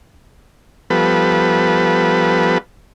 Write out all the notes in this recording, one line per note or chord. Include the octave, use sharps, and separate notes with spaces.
F3 G3 B3 A4 B4